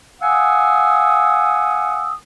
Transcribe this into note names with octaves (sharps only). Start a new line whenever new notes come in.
F5 F#5 G#5 D#6 E6